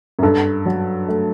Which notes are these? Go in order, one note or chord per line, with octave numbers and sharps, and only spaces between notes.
F#2
G2 A4
F#3
A3